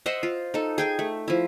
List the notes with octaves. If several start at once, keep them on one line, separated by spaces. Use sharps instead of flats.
C5 D#5 E5 F#5
F4
D#4 A4
G#4 G5 G#5
A3
F3 E4